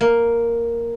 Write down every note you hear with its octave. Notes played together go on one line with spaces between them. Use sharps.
A#3